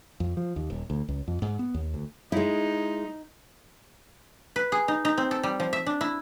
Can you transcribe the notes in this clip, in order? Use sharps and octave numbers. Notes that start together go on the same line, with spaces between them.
F2
F3
D#2
D#1
D2
C#2
F2
G#2
B3
D#2
D2
G#3 D#4 E4
B4
G#4
D#4
D#4
C4
A4
G3
F3
E5
D4
E4